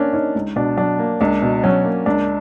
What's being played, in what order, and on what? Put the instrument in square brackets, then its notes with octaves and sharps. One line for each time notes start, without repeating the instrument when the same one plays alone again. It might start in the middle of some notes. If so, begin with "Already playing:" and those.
Already playing: [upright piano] A#3 [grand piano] C#4 D4
[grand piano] C#4 [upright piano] D#4
[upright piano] C#2
[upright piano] B2 [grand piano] D4
[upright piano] F#3 [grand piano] D4
[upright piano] A#3
[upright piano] C#2 [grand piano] D4
[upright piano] B2
[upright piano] F#3 [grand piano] C#4
[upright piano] A#3
[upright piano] C#2 [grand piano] D4